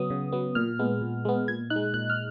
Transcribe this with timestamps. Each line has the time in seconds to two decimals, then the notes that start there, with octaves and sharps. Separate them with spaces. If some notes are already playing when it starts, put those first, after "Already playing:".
Already playing: C#3 F#3 B3 D#6
0.10 C#3
0.32 F#3 B3
0.55 A#2 F6
0.79 G#3 B3
1.01 A#2
1.25 G#3 B3
1.48 A#2 G#6
1.70 D#4 F#6
1.76 G#3
1.94 A#2 F#6
2.10 F6